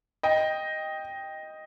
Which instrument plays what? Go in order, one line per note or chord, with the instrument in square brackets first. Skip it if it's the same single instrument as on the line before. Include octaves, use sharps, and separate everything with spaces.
[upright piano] D#5 G5